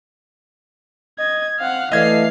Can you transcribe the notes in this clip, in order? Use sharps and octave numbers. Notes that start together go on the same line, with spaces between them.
D#5 G#6
C4 F5 F#5
E3 A3 D5 D#5 F5 G#6 C7